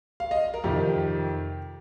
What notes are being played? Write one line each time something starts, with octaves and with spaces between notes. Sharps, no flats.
F5
D#5
A#4
F2 C3 D#3 G4